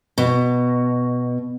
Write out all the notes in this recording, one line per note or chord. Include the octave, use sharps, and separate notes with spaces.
B2